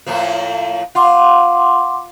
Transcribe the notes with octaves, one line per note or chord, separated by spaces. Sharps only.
A2 F3 A#3
F4 F#5 C6 D6